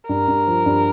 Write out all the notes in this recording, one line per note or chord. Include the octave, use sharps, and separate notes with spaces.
G2 A#4
G2
F3
G2